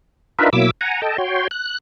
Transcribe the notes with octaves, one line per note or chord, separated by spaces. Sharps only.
D4 D#4 F4 A#4 B4 E5
B2 F#3 A#3 E4 D6 E6
F#5 G#5 A#5
A4 D#5 G5 A5
F#4 C#5 G5 C6
F#6